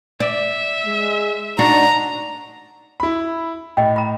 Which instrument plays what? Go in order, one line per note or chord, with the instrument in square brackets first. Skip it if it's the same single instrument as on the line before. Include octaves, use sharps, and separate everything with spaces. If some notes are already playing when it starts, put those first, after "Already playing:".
[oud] D5 [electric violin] E5
[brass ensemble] G#3
[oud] D4 F#4 [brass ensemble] D#4 [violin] A#5
[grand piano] E4 B5
[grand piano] A2 [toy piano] D#5 G5
[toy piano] A#5 B5